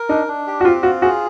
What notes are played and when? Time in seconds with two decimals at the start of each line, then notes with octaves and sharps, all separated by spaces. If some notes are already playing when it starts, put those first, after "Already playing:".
Already playing: A#4
0.09 D4 D#4
0.28 D4
0.47 G4
0.61 F#4
0.65 C4 F4
0.83 F4 F#4
1.02 F#4 G#4